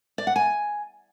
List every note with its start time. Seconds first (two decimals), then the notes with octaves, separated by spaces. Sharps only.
0.18 D5
0.27 F#5
0.36 G#5